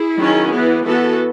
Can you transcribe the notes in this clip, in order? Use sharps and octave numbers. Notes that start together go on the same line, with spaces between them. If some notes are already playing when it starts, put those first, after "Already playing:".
Already playing: E4 G#4
D#3 F#3 C#4
E3 B3
E3 B3 F#4 A4